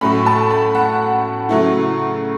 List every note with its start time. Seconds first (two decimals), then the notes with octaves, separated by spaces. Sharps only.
0.01 A2 F#3 A3 C#4 B5
0.26 A5
0.50 B5
0.75 F#5
1.49 C#3 F#3 A3 E4